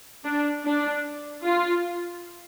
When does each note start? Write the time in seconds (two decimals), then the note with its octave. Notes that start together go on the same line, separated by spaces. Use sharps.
0.24 D4
0.64 D4
1.43 F4